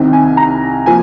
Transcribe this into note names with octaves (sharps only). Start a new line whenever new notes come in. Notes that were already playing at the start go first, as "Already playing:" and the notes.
Already playing: C2 C3 D#3 G5
G#5
A#5
F3 A#3 G#5